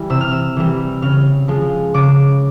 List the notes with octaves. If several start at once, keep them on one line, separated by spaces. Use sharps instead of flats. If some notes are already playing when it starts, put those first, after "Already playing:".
Already playing: E3 G3
C3 E6
F6
E6
E3 G3
C#3 F6
F3 G#3
C#3 D6